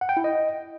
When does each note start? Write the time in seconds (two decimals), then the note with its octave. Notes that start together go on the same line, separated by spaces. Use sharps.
0.01 F#5
0.09 G5
0.17 E4
0.24 D#5